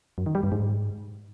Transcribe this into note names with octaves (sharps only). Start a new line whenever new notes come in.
F#2
D#3
G3
G2
G#2